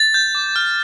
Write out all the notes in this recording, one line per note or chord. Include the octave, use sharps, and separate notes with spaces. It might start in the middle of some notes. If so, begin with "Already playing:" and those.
Already playing: A6
G6
D6
F6